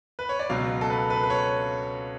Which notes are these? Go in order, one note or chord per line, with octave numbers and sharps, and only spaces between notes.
B4
C#5
D5
C#2 B2 F#3 F5
A4
B4
B4
B4
C#5